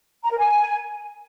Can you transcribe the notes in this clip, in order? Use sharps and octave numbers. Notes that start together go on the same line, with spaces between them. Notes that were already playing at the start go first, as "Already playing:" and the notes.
A#5
A#4
G#5